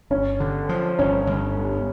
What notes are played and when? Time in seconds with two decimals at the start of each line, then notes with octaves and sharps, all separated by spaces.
0.10 G1 C#4
0.40 D3
0.69 F3
0.99 G1 C#4
1.27 G1
1.57 G2